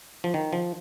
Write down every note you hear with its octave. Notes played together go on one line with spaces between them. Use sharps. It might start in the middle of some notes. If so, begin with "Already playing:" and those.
F3
D#3
F3